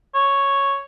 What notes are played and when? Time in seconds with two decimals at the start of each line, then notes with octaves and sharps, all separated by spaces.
0.15 C#5